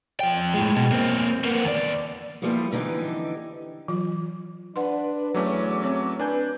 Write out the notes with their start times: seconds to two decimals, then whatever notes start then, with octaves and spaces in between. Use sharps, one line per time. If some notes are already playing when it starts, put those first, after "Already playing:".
0.20 F3 G5
0.54 A2 G#3
0.76 B2
0.92 A#3 C4
1.44 A#3 B3
1.65 D#2 D5
2.42 E3 F3 G3 A#3 B3 E4
2.72 F2 D3 E3 D#4 G4
3.88 E3 F#3 F4
4.76 D4 B4 F#5 C6
5.34 E2 F#3 A3 C#4 D6
5.83 C4 C#5
6.20 D4 B4 G#5 G6